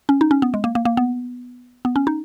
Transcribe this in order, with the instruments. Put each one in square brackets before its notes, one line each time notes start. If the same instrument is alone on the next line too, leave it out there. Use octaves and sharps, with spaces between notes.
[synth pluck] C#4
D#4
C#4
B3
G#3
A#3
A#3
A#3
B3
B3
C#4
D#4